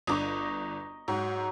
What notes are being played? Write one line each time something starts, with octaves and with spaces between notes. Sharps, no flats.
G1 D4 D#5 A#5 C#6 D6
G#2 F#3